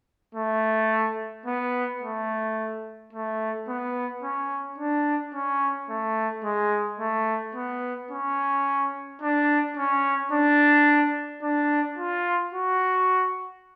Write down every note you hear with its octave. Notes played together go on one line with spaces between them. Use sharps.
A3
B3
A3
A3
B3
C#4
D4
C#4
A3
G#3
A3
B3
C#4
D4
C#4
D4
D4
F4
F#4